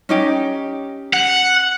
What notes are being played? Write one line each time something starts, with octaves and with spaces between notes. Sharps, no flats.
C#4 D#4 G4
F#5